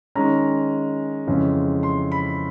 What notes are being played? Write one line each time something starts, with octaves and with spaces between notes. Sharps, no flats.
D#3 G#3 C#4 A#5
F2 C#3 E3 G#3
C6
B5